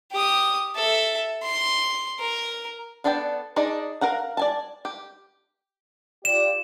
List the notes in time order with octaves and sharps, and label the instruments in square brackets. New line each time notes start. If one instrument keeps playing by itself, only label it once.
[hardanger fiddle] G4 D#6
A4 E5
C6
A#4
[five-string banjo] B3 D4 A4 D5 G5
D4 D#4 G#4 D5 D#5
A#4 F5 F#5 A#5
D5 G#5 A5
G4
[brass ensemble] F4 G4 D5 [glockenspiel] E7